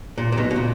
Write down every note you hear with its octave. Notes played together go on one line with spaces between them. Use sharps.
A#2
A#2
B1 B2
B2
A#2